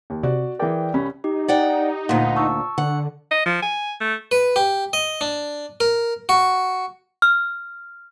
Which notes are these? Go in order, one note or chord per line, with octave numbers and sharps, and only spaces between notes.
D#2
C3 F#4 D5
E3 G#4 A#4 D5 G5
C2 C#4 B5
D#4 G4
D5 F#5 G5
D2 A#2 F#5 C6
A5 C#6 E6
D3 F#5
D#5
F3
G#5
A3
B4
G4
D#5
D4
A#4
F#4
F6